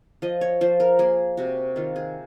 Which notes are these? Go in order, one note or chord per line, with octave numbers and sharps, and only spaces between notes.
F3 D#5
C#5
F3 C5
A#4
A#3 G#4
C3 F#4
D#3 F4
G#4